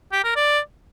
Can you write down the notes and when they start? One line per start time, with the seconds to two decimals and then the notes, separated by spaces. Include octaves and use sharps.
0.12 G4
0.24 A#4
0.36 D5